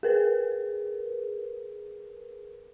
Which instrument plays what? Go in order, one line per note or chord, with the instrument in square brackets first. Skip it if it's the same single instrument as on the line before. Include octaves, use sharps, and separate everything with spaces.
[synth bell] G#4 A#4 B4